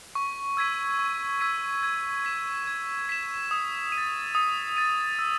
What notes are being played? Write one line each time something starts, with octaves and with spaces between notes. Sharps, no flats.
C#6
E6 G#6 B6 D#7
C#6
E6 G#6 B6 D#7
G#6
B6 E7
G#6
B6 E7
D#6
D#7
A6
D#6
A6 D#7
E6